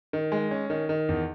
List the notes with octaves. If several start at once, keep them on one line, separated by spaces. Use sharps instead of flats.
D#3
G#3
C#4
D#3
D#3
E2